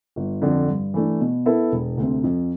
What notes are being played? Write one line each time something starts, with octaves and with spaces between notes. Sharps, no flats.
G1
F2 D3
G2
E3 A3 D4
B2
B3 E4 A4
E1
D2 C3
F2